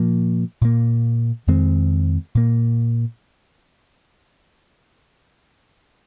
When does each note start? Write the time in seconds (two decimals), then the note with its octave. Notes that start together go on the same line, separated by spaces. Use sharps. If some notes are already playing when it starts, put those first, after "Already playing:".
Already playing: A#2 F3 A#3
0.61 A#2 A#3
1.47 F2 D#3 G#3 C4
2.35 A#2 A#3